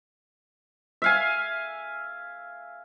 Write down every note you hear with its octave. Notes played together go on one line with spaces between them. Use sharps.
E5 F5 G#5